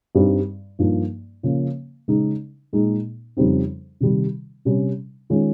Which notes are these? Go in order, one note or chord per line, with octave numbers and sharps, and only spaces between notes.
G2 G3 C4 D#4
G2 F3 A#3 D#4
C#3 F3 A#3
C#3 G#3 D#4
A#2 G#3 D#4
F2 C#3 G3 C4 D#4
C3 D#3 G3
C3 G3 C#4
D#3 G#3 C#4 F4